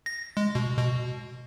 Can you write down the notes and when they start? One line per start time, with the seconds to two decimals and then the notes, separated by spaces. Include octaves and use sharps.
0.06 A#6
0.37 G#3
0.55 B2
0.78 B2